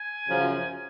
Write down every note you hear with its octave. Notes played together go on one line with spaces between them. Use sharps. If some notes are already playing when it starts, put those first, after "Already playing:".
Already playing: G#5
F#2 C#3 F3